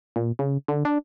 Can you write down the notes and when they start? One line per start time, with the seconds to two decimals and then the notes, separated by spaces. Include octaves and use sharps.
0.16 A#2
0.39 C#3
0.68 D3
0.85 D4